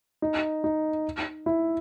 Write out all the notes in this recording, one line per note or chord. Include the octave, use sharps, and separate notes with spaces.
D#4
D#4
E4